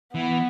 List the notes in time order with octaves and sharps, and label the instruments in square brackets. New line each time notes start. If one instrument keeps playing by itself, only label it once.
[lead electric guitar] E3 [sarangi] B3